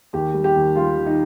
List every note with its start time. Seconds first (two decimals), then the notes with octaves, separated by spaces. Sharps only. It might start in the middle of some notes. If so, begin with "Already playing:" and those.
0.13 D#2 G4
0.34 G3
0.44 G4
0.56 D#2
0.75 G3 F4
0.97 D#3
1.06 D#4